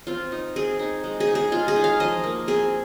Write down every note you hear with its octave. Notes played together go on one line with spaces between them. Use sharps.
C4 F4
D#4
C4 G#4
D#4
G#3
G#4
D#4
G#4
G#3 F4
G#4
D#4
F5
F3 D#5
A#3
C4 G#4